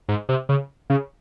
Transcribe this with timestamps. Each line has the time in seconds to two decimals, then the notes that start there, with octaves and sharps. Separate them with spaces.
0.09 G#2
0.29 C3
0.49 C#3
0.90 C#3